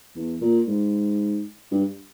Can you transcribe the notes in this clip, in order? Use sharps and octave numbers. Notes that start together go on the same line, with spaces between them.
E2
A#2
G#2
G2